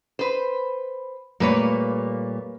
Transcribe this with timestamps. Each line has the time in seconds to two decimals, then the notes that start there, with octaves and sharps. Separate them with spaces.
0.19 B4 C5
1.40 A#2 G3 A3 A#3 B4 C#5